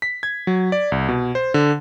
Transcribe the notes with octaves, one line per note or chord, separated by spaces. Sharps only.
B6
G#6
F#3
D5
C2
B2
C5
D3